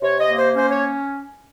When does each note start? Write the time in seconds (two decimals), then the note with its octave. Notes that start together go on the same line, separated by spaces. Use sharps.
0.02 C3 C#5
0.20 D#5
0.29 A#3
0.38 C5
0.55 C#4 C5
0.70 C#5